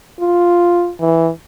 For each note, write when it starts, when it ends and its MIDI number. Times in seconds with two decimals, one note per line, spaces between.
0.20 0.91 65
1.00 1.29 52